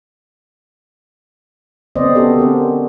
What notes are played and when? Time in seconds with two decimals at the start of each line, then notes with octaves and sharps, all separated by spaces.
1.96 D3 B3 C4 C5 D5 D#5
2.15 B3 C#4 F#4 G4 A4 B4
2.39 C4 D4 A#4